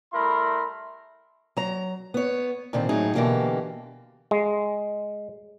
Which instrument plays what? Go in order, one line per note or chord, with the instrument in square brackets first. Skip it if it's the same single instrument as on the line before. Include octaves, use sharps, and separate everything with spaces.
[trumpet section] G3 A3 E4 A#4 B5 C6
[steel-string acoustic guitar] F#3 A#5
B3 C#5
A#2 D3 D#3 C4
A2 F#3 D#4 G#4
B2 D3 E3 A#3 G4
[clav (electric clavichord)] G#3